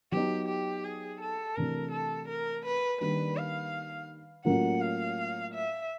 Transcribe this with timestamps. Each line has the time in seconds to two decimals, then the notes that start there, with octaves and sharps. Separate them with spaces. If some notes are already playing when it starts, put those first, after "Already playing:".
0.12 F#3 B3 D#4 G4
0.49 G4
0.84 G#4
1.21 A4
1.56 C3 E3 A3 D4 A#4
1.92 A4
2.28 A#4
2.65 B4
3.01 D#3 G3 A#3 D4 B4
3.37 F5
4.45 A2 F#3 A#3 C#4 F4 F#5
4.81 F5
5.54 E5